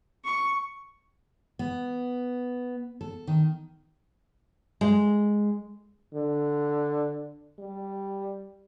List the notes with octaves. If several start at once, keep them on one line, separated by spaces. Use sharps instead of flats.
C#6
B3
A4
D#3
G#3
D3
G3